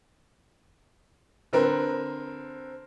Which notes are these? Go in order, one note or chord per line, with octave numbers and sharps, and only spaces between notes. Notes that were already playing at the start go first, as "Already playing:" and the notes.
D3 C4 A#4 B4